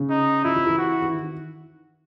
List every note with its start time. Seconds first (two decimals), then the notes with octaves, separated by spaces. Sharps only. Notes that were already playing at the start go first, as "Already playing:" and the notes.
Already playing: C#3
0.10 D#4
0.44 F3 E4
0.56 F3
0.67 E3
0.78 F#4
1.02 E3
1.13 D#3